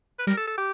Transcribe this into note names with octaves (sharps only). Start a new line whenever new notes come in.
B4
G3 A#4
A4
A4
G4